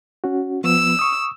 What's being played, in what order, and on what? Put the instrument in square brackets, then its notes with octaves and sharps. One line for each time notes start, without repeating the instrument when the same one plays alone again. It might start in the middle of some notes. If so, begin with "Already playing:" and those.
[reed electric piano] C#4 F#4
[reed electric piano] F3 B3 [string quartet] E6
[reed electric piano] C#6 D#6